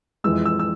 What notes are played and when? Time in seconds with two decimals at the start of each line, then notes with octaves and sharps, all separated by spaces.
0.24 F2 E3 G#3 E6
0.46 E6
0.59 E6